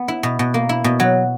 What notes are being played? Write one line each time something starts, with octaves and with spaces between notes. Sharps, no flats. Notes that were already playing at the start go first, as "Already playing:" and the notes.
Already playing: B3
E4
B2
B2
A#3
E4
B2
F#3